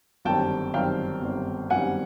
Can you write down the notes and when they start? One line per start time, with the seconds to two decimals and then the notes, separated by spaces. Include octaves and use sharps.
0.25 G1 F#2 D#3 G3 C4 G5 A5
0.74 G1 F#2 D#3 G3 C4 F5 G5
1.22 G1 F#2 D#3 G3 C4
1.70 G1 F#2 D#3 G3 C4 F#5 G#5